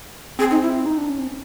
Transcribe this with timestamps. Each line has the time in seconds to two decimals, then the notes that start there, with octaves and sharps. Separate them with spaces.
0.39 C4 G#4
0.51 D#4
0.62 E4
0.86 D#4
0.98 D4
1.09 C#4
1.19 C4